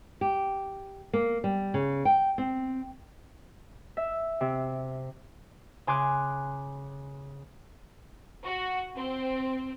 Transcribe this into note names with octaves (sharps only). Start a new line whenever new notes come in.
G4
A#3
G3
C#3
G5
C4
E5
C3
C#3 G#5 C6 D6 F#6
F#4
C4